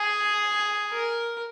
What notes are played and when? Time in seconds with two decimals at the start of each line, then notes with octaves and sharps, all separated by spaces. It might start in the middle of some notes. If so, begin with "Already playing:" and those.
Already playing: G#4
0.92 A#4